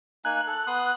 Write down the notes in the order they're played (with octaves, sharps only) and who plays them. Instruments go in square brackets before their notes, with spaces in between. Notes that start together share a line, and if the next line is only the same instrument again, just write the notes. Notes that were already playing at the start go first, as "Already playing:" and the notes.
[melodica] A#3 D#4 G#5 [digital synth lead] F#6
[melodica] A4
B3 C6 D#6